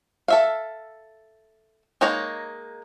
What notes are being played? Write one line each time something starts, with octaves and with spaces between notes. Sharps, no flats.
A4 E5 F5
G#3 A#3 D#4 C#5 A#5